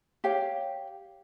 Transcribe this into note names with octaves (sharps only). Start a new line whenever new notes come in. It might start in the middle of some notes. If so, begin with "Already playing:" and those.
G4 C#5 F5